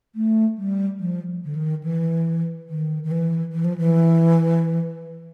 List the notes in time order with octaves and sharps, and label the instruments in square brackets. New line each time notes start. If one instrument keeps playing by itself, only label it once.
[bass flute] A3
G3
F3
D3
D#3
E3
D#3
D#3
E3
E3
F3
E3